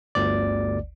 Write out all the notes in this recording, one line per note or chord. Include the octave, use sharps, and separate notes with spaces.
G1 D2 D5